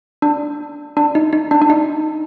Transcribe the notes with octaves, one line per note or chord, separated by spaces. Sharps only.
D4
D4
D#4
D#4
D4
D4
D#4